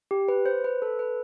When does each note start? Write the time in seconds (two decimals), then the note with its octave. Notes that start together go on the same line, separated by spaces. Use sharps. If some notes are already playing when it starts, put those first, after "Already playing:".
0.11 G4
0.28 B4
0.46 C5
0.64 B4
0.82 A4
0.99 B4